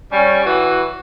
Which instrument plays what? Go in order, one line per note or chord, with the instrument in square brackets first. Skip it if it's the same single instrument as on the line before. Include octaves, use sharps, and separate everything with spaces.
[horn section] G3 C#4
E3 F#4